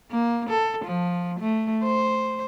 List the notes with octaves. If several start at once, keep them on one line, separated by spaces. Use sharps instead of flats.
A#3
A4
F3
A3
C5